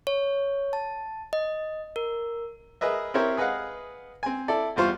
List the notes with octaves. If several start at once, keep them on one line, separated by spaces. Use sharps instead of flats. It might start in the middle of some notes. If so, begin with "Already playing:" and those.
C#5
A5
D#5
A#4
G#4 A#4 B4 D#5 E5
C4 E4 G4 A#4 C5 C#5
G#4 B4 D#5 F5 F#5
C4 G#5
E4 A4 D5
E2 G3 F4 C5 C#6